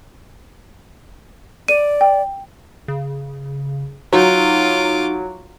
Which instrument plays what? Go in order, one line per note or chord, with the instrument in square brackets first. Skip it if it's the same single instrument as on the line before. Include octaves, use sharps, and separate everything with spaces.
[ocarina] D5 [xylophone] D#7
[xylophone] G5
[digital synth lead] C#3
[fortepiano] F#3 [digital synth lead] D#4 [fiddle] F4 D6